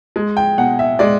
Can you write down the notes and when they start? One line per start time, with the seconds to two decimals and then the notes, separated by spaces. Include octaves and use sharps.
0.16 G#3
0.37 G5
0.58 B2 F#5
0.79 E5
0.99 G#3 D5